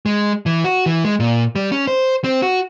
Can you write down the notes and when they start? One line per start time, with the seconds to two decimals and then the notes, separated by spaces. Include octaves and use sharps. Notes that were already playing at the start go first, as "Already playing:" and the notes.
0.06 G#3
0.46 E3
0.64 F#4
0.86 E3
1.05 G#3
1.20 A#2
1.56 G3
1.72 C#4
1.87 C5
2.24 C4
2.42 F#4